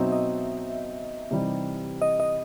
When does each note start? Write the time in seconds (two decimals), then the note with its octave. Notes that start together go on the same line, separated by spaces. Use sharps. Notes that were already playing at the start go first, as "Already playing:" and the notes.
Already playing: B2 F#3 C4 D#4 E5
0.12 D#5
1.31 C3 E3 G3 D#4
2.02 D#5
2.20 D#5